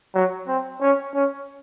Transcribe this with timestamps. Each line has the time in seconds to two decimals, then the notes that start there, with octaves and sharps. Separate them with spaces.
0.15 F#3
0.48 C4
0.81 C#4
1.15 C#4